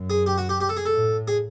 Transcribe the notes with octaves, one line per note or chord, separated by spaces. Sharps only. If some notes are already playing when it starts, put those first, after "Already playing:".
Already playing: F#2
G#4
G4
F#4
G4
G4
A4
G#4
A4
A2
G#4